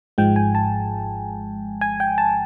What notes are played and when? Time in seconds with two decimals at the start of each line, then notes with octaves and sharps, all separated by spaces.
0.18 G#1 G#2 F3 G#3 G5
0.36 G#5
0.55 A5
1.81 G#5
2.00 G5
2.18 A5